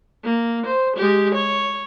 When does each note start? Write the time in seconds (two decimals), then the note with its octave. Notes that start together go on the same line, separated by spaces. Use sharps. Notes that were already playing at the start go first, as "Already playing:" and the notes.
0.24 A#3
0.66 C5
0.96 G#3 G4
1.34 C#5